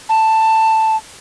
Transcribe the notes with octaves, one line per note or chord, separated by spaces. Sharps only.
A5